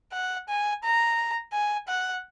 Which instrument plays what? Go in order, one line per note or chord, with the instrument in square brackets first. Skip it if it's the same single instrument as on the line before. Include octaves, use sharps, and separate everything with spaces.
[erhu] F#5
G#5
A#5
G#5
F#5